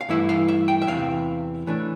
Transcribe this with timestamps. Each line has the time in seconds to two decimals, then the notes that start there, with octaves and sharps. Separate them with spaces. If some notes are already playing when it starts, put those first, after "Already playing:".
0.01 F5
0.09 G2 E3 A3 E4 E5
0.29 F5
0.48 E5
0.68 G5
0.82 E5
0.87 E2 C3 E3 F5
1.66 A2 E3 A3 D4